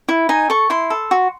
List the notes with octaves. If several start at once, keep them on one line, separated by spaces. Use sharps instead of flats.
E4
D#4 G#5
A4 C#6
E4 C6
A4
F#4